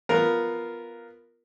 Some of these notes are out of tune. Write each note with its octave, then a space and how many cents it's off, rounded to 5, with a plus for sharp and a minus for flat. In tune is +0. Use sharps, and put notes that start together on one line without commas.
B3 +0 F4 +0 A#4 +0